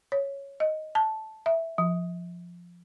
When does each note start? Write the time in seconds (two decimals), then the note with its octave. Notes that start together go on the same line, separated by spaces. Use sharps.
0.12 C#5
0.60 D#5
0.95 A5
1.46 E5
1.78 F3